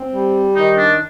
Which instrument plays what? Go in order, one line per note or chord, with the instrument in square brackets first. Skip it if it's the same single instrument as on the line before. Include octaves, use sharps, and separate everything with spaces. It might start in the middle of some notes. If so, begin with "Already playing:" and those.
Already playing: [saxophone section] C4
G3
[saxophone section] D#3 [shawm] D#4
[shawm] D4